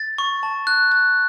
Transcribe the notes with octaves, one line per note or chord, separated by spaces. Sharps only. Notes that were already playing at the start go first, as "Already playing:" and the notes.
Already playing: A6
C#6
A5
F#6
F#6